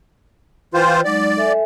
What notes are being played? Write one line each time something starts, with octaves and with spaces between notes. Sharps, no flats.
E3 F4 C5 G5
F#3 G#3 D#4 D5
A4 E5 G#5